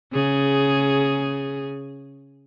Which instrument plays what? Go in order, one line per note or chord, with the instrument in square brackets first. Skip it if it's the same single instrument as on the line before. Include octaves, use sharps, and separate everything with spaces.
[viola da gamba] C#3 G#4